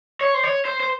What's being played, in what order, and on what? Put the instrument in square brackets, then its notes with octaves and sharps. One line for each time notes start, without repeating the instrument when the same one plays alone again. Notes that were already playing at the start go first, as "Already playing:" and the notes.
[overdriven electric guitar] C#5
C5
C#5
C5
C5